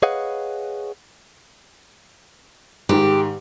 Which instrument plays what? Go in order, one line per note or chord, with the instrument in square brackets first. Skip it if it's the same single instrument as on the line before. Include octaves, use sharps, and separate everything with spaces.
[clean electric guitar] G#4 B4 C#5 D#5 F5 F#5
[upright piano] G#2 D#3 [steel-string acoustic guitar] G4